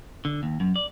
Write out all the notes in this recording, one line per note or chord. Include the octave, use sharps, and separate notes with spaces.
D3
D#2
F#2
D5